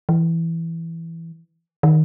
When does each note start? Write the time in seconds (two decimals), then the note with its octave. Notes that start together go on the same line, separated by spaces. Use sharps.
0.09 E3
1.83 D#3